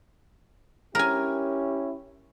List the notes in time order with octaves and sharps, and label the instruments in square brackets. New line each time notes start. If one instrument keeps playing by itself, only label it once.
[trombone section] C#4 E4 G4 [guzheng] A#4 G#5